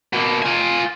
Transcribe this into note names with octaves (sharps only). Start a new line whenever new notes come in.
B2 A#3
F4 G#5